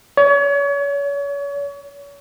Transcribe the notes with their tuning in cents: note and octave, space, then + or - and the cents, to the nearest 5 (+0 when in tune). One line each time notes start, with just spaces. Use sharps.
C#5 +35